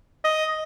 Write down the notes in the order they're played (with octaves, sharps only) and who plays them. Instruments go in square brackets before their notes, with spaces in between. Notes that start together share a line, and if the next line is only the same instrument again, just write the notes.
[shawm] D#5